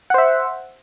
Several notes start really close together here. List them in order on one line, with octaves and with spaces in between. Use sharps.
F#5 C5 E5